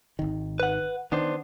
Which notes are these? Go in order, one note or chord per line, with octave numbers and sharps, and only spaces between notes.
G#1 D#3
B4 F#5
D#3 B3 D4 C5